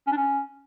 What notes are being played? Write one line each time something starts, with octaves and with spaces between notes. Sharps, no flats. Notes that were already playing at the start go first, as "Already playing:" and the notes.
C#4
D4
C#4